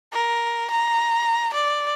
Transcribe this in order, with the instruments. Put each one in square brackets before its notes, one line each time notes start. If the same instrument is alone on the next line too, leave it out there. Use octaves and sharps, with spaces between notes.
[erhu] A#4
A#5
D5